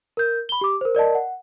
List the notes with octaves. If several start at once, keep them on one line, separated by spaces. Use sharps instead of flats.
A#4 G6
B5 G7
G4 D6
A#4 C5
A#4 D5 D#5 A5
F#5